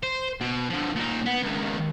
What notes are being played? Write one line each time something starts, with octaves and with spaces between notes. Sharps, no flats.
C5
B2
D3 F3
A#2 D#4
B3
C#2 D#3